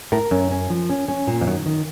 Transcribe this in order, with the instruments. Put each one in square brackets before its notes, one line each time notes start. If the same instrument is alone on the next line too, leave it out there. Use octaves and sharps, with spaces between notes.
[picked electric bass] A2 [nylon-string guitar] A#4
[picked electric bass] F#2 [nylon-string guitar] C#4
[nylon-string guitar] C#4
F3
C#4
C#4
A#2
[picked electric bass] F2
[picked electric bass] F#2 [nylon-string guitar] D#3
[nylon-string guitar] D#3